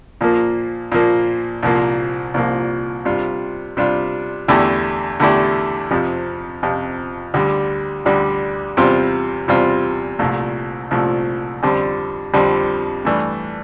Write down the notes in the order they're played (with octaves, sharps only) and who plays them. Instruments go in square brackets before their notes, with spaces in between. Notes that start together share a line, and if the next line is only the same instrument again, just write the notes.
[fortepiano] A#2 F3 A#3
A#2 F3 A#3
C2 A#2 F3 A#3
C2 A#2 F3 A#3
C3 G3 D4 F4
C3 G3 D4 F4
E2 D3 A3 E4 G4
E2 D3 A3 E4 G4
F2 C3 F3
F2 C3 F3
D2 D3 G3 D4
D2 D3 G3 D4
E2 C3 G3 C4 F4
E2 C3 G3 C4 F4
C2 A#2 F3 A3
C2 A#2 F3 A3
F2 D3 G3 C4
F2 D3 G3 C4
G2 E3 A3 D4